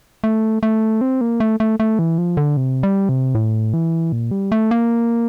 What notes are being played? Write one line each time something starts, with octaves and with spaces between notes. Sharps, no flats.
A3
A3
C4
A#3
A3
A3
A3
E3
F3
D3
C3
G3
C3
A2
E3
A#2
G3
A3
A#3